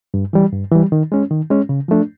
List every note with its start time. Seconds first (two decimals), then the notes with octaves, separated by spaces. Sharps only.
0.14 G2
0.33 E3 G3
0.53 G2
0.72 E3 G3
0.92 D#3
1.12 G#3 C#4
1.31 D#3
1.50 G#3 C#4
1.69 C#3
1.88 F3 A3 D4